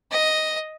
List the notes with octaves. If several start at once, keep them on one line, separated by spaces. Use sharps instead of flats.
D#5